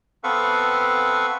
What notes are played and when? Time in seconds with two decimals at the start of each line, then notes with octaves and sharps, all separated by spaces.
0.24 B3 C4 A4 B4 F5 C#6